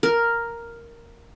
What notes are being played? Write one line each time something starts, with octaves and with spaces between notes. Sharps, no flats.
A#4